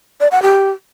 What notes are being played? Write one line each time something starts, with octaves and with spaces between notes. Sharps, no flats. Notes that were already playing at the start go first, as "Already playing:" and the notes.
D5
F#5
G4